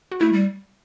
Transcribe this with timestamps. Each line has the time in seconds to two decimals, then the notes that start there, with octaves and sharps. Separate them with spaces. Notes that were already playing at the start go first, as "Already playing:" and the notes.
0.12 F#4
0.21 A3 E4
0.33 G3